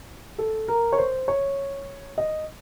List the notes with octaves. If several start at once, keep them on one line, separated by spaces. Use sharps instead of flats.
A4
A#4
C#5
C5
C#5
D#5